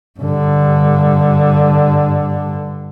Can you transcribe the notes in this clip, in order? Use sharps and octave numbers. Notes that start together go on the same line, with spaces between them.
G2 D3